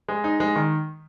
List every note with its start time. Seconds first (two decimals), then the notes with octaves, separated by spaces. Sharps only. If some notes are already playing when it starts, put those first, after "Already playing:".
0.08 G#3
0.24 D#4
0.40 G#3
0.56 D#3